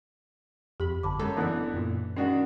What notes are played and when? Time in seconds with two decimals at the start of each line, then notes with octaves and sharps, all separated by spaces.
0.80 F2 G4 B5
1.03 G1 A5 B5 D6
1.19 F#2 G#3 A4
1.37 D3 E3 B3 D5 D#5
1.74 F#2 A#2
2.17 D#3 G#3 C#4 D4 F#4